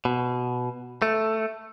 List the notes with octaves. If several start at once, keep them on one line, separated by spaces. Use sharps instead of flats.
B2
A3